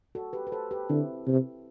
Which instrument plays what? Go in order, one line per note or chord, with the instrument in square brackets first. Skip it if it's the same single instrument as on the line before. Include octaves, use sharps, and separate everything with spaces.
[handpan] F#4 A4
G4 B4
B4
A4 C5
G4 B4
[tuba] D3 [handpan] C4 E4
[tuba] C3